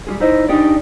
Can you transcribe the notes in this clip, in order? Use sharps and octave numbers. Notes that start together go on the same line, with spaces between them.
G3 F4 G#4
D#4 E4 C5 D#5
D4 D#4 G4 G#4 D5